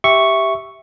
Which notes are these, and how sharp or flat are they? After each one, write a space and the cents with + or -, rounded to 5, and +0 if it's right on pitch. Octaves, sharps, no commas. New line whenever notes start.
G4 +0 E5 +0 C#6 +0